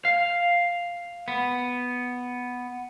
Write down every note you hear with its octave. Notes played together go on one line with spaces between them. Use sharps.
F5
B3